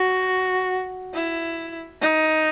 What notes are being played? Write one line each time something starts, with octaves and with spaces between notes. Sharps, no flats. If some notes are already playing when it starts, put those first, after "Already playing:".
Already playing: F#4
E4
D#4